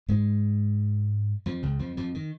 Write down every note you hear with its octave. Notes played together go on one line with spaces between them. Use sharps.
G#2 G#3
F2 F3
C#2 C#3
F2 F3
F2 F3
D#3